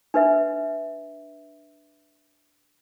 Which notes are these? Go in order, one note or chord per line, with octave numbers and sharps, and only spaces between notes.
D4 B4 E5